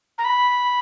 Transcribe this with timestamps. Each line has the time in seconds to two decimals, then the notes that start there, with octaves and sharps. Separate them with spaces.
0.18 A#5
0.25 B5